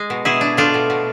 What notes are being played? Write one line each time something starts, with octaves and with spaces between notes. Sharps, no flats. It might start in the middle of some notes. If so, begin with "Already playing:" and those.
Already playing: G#3
B2
B2 E4 G#4
D4
A3 D4 F4
B2
B2